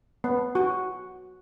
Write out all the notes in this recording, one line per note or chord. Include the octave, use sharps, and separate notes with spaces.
B3
F#4